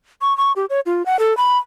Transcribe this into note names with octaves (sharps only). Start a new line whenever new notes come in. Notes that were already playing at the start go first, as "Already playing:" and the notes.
C#6
C#6
G4
C#5
F4
F#5
A4
B5